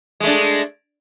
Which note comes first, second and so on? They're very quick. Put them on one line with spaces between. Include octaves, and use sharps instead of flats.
G#3 A3 D4